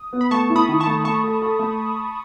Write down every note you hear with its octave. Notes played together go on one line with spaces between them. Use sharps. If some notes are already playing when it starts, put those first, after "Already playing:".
Already playing: D#6
B3
B5
A3 A5 C#6
E4
B5 D#6
D#3
A5 C#6
A3
A3 A5 C#6
A4
A4
A3